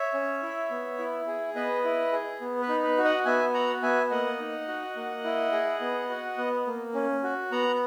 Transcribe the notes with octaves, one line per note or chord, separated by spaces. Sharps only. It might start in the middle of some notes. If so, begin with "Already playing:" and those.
Already playing: C#5 E5
C#4
E4
B3
E4
G#4
B3 B4 D#5
E4
G#4
B3
B4
D#4
B4
F#4
D#5 F#5
B3 E5 G#5
F#4 F#5 A#5
B3 E5 G#5
A#3 D#5 F#5
D#4
F#4
A#3
E4
G#4
B3
F#4
B3
A#3
C#4
F#4
B3 F#5 A#5